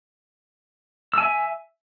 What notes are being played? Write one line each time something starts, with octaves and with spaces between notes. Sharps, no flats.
E5 G#5 E6